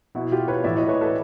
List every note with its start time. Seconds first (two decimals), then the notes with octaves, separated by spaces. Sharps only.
0.15 B2 E4 F#4
0.32 F4 G4
0.48 B4 C#5
0.64 A2 E3 D5 E5
0.77 C#5 D#5
0.88 B4 C#5
1.01 A4 B4